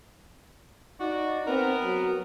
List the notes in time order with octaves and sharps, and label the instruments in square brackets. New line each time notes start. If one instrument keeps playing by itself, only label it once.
[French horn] D#4 [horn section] F#4 D5
[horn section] B3 A#4 [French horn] C4
[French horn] F#3